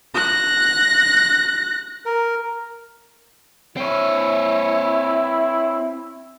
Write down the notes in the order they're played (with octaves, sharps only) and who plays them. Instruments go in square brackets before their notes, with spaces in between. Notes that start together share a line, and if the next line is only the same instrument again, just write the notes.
[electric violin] F#6 A#6
[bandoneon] A#4
[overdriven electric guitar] C4 C#5 [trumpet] E4